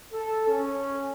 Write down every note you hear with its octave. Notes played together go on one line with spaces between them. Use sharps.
A4
C#4